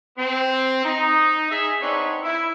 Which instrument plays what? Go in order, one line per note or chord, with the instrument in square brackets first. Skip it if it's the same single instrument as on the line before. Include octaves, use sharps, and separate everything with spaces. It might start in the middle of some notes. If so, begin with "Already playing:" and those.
[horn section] C4
D#4
G#4 E5
B3 C4 D4 D#4 B4 C#5
E4